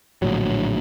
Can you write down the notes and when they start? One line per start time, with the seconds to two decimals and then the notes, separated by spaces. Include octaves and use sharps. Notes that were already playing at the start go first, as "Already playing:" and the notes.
0.22 A#1 A2 D3 F#3